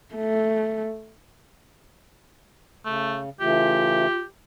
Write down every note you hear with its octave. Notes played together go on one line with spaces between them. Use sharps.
A3
C#3 A3
C#3 E3 A3 F4 G4